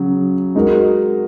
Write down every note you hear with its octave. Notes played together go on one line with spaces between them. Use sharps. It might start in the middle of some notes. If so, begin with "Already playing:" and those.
Already playing: C#3 F#3
G#3 D#4 F#4 A#4